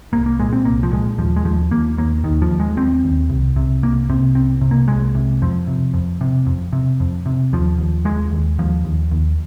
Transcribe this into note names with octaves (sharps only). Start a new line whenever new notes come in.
C2 A#3
A#3
A#2 G#3
C4
C2 A#3
F3
A#2 G#3
D#2 F3
G#3
D#2 F3
D#2 A#3
D#2 A#3
D#2 D#3
F3
D#2
G#3
D#2 C4
D#2
C2
C3
C2 A#3
C3 C4
C2 C4
C3
A#3
C2 G#3
C3
F2 F3
C3
F2
C3
F2
C3
F2
C3
D#2 F3
D#2
D#2 G#3
D#2
D#2 F3
D#2
D#2